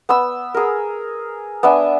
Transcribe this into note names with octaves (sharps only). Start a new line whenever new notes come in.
B3 B5 E6
G#4 A#4
B3 D4 E5 G#5